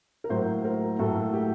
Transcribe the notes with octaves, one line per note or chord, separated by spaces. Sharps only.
A#4
A2 F#3 A#3 C5
A#4
A2 F#3 A#3 A4
G4